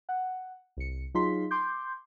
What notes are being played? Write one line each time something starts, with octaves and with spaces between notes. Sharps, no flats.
F#5
C2 C#7
F#3 D#4 F4 G#4 C6 B6
C6 D6 G6